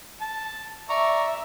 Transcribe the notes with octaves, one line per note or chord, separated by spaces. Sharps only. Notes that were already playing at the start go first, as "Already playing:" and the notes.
A5
D5 E5 A#5 C#6